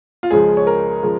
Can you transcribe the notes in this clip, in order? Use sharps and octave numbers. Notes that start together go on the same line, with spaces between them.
F4
C#2 C#3 F3 G#3 G#4
C#5
A#4
C#3 F3 G#3